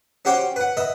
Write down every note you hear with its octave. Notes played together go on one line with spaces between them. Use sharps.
C#4 F#4 G4 C5 C#5 G5
B4 F#5
B4 D#5 E5